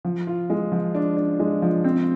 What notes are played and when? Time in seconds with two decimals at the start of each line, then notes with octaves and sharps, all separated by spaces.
0.05 F3
0.27 F4
0.50 G#3
0.72 F3
0.95 D4
1.17 D4
1.40 G#3
1.62 F3
1.84 C4